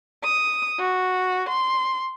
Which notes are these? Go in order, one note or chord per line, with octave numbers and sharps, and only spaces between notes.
D#6
F#4
C6